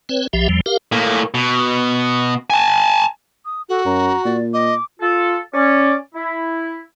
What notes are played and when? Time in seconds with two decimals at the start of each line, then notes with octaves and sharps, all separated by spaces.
0.09 C4 B4 C#5
0.33 B1 F3 G4 E5
0.49 E2 F3 G3
0.66 G4 A#4 F5
0.92 A2 A#3
1.34 B2
2.50 G#5 A5
3.45 D#6
3.69 F#4 A4
3.85 F#2 A#5
4.25 A#2 D5
4.54 D#5 D6
4.99 F4 A4
5.54 C#4 D5
6.14 E4